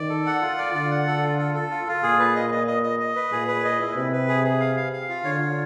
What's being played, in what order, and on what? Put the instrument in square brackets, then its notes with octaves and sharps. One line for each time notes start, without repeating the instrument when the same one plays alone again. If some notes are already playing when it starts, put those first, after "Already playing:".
Already playing: [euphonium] D#3 [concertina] D5
[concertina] A4
F#5
F4
D5
[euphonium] D3 [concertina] F4
[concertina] F#5
A4
F4
A4
A4
F4
F4
[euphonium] A#2 [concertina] G#4
[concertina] B4
D#5
D#5
D#5
D#5
D#5
B4
[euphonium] A#2 [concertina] G#4
[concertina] B4
D#5
E4
[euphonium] C3 [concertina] B4
[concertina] B4
G#4
G#4
F5
F5
F5
F4
[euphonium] D3 [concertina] C#5
[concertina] F4